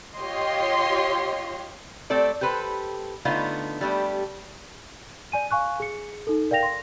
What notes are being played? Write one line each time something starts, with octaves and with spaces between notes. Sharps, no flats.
F4 G4 C#5 D#5 C6
A3 C4 A4 D5
G4 A4 B4 C5
D3 A3 B3 D#4 F4
G3 A3 B3 G4
D5 G#5 D#7
F5 G#5 C#6 F#6
G#4 C#7
D#4 A4
A#4 D5 F5 G5 A#6 F7
C6 A#6